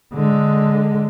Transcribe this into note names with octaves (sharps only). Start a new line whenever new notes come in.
D3 G#3